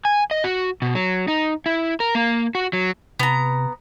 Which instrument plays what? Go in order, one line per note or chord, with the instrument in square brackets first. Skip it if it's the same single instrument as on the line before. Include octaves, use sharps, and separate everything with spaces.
[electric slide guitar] G#5
D#5
F#4
B2
F#3
D#4
E4
A#4
A#3
F#4
F#3
[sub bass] C3 [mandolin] B3 A#5